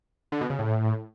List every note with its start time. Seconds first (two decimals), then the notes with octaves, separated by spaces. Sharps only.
0.32 D3
0.41 B2
0.50 C#3
0.59 A2